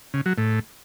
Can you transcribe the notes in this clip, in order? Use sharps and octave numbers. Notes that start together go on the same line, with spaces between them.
C#3
F#3
A2